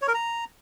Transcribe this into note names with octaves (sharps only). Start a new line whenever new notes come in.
C#5
A#4
A#5